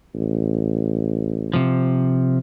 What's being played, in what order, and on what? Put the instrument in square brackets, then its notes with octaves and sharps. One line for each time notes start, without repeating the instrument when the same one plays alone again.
[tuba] A1
[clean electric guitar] C3 F3